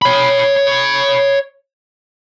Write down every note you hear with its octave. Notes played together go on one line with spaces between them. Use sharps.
C#5 B5